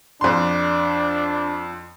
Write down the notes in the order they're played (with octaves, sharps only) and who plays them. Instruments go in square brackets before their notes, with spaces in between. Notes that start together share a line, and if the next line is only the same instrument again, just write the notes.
[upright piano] F2 C6 [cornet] D4